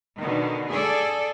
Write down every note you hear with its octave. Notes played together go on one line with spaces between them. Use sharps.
B2 D3 D#3
G#4 A4 D5